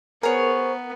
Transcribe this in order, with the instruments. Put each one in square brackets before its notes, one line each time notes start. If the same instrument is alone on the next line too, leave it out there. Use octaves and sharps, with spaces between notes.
[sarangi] B3 [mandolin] G#4 C#5 [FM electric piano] A#4 [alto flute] C5